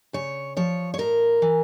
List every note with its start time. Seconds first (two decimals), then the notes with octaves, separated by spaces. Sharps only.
0.13 C#3 C#5
0.57 F3 C#5
0.94 C#5
0.98 A2 A#4
1.42 E3